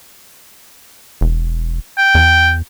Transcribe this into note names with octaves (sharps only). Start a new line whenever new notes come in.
E1
G5
E2